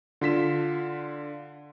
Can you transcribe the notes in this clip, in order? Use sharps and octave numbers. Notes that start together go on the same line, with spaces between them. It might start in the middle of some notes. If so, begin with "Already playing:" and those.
D3 F4 B6 E7